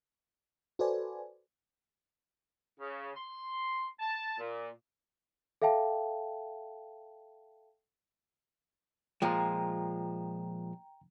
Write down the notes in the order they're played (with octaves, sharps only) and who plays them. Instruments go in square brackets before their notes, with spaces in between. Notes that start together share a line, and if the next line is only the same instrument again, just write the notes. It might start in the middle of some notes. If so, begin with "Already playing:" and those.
[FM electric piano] F#4 A4 B4 C5 D5 G#5
[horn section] C#3
C6
A5
A#2
[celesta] A4 E5 F5 G5 A5
[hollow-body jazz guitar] A#2 F3 G#3 [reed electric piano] G5 A#5